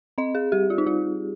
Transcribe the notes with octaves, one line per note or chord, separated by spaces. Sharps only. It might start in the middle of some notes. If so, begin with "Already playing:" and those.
C4 D#5
G#4
G3 G4
F4
D#4
G3 F4